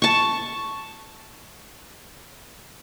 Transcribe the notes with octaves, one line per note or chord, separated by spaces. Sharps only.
A5 C#6